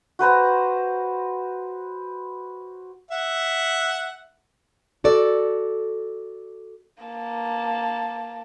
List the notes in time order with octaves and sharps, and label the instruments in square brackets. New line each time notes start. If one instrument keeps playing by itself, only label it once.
[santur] F#4 B4 C5 A#5
[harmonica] E5 F#5
[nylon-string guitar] F#4 A4 D5
[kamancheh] A#3 A5